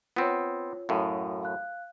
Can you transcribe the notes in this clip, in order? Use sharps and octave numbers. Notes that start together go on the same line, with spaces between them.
B3 C4 F4 C#5
F#2 A2 F5
F5 F#6